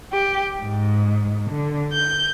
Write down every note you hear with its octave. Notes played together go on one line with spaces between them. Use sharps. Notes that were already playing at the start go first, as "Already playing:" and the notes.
G4
G#2
D3
G6